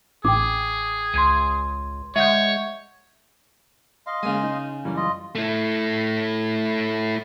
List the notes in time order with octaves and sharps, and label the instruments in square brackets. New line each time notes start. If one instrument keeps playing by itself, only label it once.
[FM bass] A1 [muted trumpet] G#4 [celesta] G5 D6
[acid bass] C#2 [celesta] C6 G#6 D#7
[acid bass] G#3 [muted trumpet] C#5 [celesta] E5 F#5 G6
[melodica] D#5 F5 C6
[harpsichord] C#3 G#5 [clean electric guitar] G#3 A#3
[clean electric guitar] D#4
[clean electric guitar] F#2 E3 G3 [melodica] A#3 C#4
[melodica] F4 D#5
[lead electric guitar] A3 E4